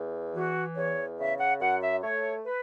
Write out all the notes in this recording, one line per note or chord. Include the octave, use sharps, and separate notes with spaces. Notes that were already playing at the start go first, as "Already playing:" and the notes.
Already playing: E2
E3 F#4
E2 C#5
C#3 E5
F#5
F#2 F#5
E5
A3 C#5
B4